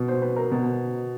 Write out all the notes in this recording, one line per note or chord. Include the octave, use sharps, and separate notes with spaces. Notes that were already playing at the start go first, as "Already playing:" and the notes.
Already playing: B2
C5
B4
A#4
B2